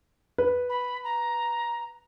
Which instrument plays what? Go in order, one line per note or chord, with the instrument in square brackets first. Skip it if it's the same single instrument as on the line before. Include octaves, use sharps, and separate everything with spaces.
[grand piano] B4
[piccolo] B5
A#5